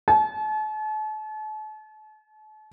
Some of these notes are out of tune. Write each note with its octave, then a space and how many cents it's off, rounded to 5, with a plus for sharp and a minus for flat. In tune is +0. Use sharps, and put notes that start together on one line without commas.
A5 -40